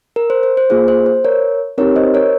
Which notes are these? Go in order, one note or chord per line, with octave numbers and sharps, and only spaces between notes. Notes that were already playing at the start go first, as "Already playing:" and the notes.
A#4
C5
C5
C5
A#3 F4 G#4 C5
C5
C5
A#4 C#5
C4 D#4 G4 A#4 C#5
C5 D#5
A#4 C#5